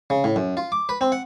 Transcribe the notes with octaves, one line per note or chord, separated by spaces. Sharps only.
C#3
A2
F#2
F4
D6
B4
C4
F#5